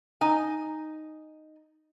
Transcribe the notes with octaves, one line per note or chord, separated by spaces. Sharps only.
D#4 G#5